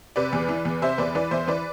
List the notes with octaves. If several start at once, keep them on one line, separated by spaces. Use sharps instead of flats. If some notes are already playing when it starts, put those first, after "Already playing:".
C3 B4 D5
E2
E3
E2
C3 C5 E5
E2 B4 D5
E3 B4 D5
E2 C5 E5
E3 B4 D5